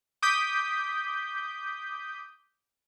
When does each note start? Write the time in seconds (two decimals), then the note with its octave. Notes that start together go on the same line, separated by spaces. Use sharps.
0.22 D6 D#6 G6 B6